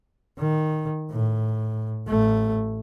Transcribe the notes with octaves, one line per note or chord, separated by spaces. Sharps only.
D#3
A2
A1 A3